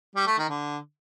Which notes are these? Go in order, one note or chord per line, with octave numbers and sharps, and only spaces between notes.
G3
A3
D#3
D3